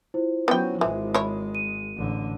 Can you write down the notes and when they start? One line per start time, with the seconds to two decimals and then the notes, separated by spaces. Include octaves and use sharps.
0.14 E4 F4 C5
0.48 F#3 B3 C#4 G5
0.81 G#1 E3 G#3
1.14 E4 C#5
1.55 D#7
1.96 A1 D3